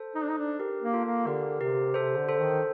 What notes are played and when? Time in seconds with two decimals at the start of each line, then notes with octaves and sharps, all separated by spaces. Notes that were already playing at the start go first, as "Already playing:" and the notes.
Already playing: A4 C5
0.15 D#4
0.23 D4
0.29 D#4
0.37 D4
0.59 G4 A#4
0.82 A#3
0.94 F4 A4
1.05 A#3
1.27 D3 G4 A#4
1.61 C3 G4 A#4
1.94 C3 A4 C5
2.17 D3
2.29 A4 C5
2.40 D#3